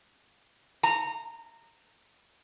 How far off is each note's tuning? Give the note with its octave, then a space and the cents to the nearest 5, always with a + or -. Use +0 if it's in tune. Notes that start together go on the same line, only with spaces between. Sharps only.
A#5 -15